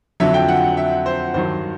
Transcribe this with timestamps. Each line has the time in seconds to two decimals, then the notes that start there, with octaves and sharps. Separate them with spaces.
0.20 F2 D3 F#3 E5
0.34 G5
0.48 F#5
0.77 E5
1.06 C5
1.34 G2 D#3 F#3 C5